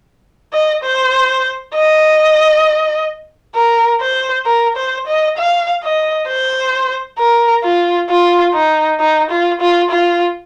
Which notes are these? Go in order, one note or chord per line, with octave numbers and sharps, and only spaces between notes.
D#5
C5
D#5
A#4
C5
A#4
C5
D#5
F5
D#5
C5
A#4
F4
F4
D#4
D#4
F4
F4
F4